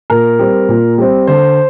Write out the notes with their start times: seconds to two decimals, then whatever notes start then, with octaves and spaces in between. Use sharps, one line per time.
0.10 A#2 A#4
0.39 G3 C4
0.69 A#2
0.98 G3 C4
1.27 D3 C5